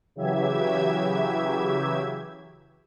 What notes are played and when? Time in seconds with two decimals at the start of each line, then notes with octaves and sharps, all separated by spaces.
0.16 C#3 E3 F#3 G4 E5 G#6